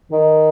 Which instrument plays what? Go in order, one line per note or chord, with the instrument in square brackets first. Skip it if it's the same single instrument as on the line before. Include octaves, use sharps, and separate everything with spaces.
[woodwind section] D#3